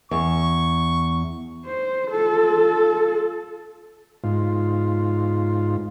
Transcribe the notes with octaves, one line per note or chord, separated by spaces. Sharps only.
E2 C#6
C5
F4 A4
G#2 F4